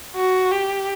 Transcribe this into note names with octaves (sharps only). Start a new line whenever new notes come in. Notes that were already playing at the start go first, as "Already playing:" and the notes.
F#4
G4